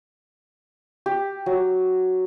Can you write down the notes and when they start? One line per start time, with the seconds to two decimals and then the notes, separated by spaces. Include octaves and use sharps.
1.06 G4
1.46 F#3